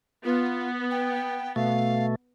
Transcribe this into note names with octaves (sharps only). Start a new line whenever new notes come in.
B3 F4
G5
B2 A3 F5